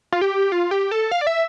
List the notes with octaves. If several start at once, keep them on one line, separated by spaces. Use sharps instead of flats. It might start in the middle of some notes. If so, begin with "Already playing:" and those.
F4
G4
F4
G4
A4
F5
D5
E5